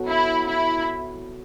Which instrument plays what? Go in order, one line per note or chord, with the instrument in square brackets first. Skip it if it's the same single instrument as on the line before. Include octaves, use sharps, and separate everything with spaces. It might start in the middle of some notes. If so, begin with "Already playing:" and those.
Already playing: [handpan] B3 F#4 A4 C#5
[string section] E4
E4